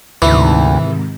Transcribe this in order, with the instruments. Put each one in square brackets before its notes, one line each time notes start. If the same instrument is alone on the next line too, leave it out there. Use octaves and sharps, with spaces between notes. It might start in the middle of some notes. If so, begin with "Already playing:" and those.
[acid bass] D2 [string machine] G#2 C3 D#3 [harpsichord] E3